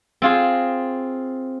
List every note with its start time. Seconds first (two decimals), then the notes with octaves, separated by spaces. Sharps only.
0.22 C4 F4 G#4